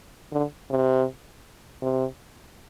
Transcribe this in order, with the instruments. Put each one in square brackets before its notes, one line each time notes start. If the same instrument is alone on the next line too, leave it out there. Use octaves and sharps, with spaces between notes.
[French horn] D3
C3
C3